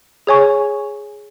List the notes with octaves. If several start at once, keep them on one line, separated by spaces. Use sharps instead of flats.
G#4 C#5 G#5 C#6